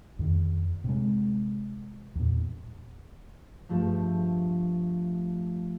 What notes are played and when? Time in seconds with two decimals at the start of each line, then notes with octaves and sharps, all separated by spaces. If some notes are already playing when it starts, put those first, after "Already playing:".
0.19 F2 D#3
0.84 C3 G#3
2.15 E2 A#2
3.69 G2 F3 A3